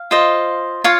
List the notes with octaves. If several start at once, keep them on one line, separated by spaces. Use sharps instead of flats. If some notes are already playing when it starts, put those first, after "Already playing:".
Already playing: F5
F4 C5 D#5
F4 C#5 F5